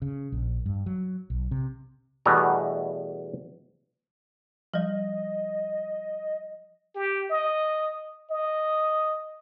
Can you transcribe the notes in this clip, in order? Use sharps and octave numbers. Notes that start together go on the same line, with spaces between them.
C#3
A#1
G2
F#3
B1
C3
E2 B2 G3 A3 B3 A#5
F3 G3 D#5
G4
D#5
D#5